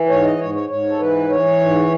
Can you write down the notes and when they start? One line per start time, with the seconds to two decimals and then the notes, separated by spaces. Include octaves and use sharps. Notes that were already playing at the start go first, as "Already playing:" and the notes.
Already playing: E3
0.09 G#2 C#5
0.24 D#5
0.39 G#2 C#5
0.55 C#5
0.70 G#2 C#5
0.89 A4
0.99 E3 B4
1.30 E3 C#5
1.61 G#2